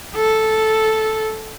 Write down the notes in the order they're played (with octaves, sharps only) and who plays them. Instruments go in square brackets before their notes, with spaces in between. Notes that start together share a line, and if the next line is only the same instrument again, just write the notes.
[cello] A4